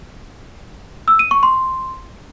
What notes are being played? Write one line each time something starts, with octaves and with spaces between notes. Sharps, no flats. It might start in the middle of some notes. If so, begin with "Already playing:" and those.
E6
D#7
C#6
C6